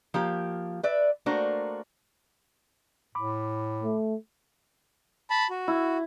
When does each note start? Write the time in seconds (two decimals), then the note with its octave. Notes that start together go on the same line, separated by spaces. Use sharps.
0.14 F3 A#3 G4
0.83 B4 D5 E5
1.26 A3 A#3 D4 F#4 A#4 C5
3.15 A2 B5 D6
3.83 A3
5.30 A5 B5
5.50 F#4
5.68 E4